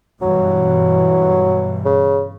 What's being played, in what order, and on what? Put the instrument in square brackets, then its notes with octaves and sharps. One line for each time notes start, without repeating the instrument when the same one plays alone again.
[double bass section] G2 B2 E3 [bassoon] F#3
[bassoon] C#3